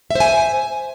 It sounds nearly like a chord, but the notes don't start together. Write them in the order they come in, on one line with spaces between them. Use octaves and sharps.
E5 C5 G#5